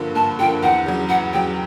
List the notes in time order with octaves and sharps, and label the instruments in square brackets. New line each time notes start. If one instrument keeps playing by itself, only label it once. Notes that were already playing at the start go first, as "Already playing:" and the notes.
Already playing: [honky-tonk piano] G2 D3 F3 A#3
[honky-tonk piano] G2 [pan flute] A5
[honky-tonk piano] D3 F3 A#3 [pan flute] G5
[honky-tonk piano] E2 [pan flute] F#5
[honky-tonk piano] C#3 F#3
[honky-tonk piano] E2 [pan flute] F#5
[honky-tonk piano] C#3 F#3 [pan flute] G5